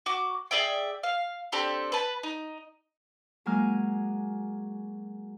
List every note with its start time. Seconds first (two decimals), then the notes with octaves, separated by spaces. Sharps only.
0.06 F#4 D6
0.51 G#4 D5 E5 G5
1.03 F5
1.52 C4 D4 G4 A4
1.92 B4 A5
2.23 D#4
3.46 F#3 G#3 A#3 G#5 D6 F6